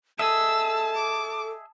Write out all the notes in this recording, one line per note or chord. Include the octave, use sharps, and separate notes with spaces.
G#4 A4 D#5 E5 A5 E6
D6